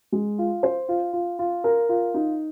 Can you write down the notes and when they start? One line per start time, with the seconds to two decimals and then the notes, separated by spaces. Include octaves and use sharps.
0.12 G#3
0.38 F4
0.63 C5
0.89 F4
1.13 F4
1.39 F4
1.64 A#4
1.89 F4
2.14 D#4